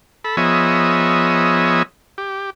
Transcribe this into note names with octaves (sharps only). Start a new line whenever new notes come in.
A4 B5
F3 B3 G#4 C#5 D#5 E5
G4